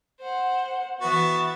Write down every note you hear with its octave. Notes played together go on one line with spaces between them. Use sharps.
C5 F#5
E3 B3 F#4 E5 A6